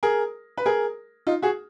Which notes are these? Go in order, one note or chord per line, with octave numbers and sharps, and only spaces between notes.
G#4 A#4
B4
G#4 A#4
D#4 F4
F#4 G#4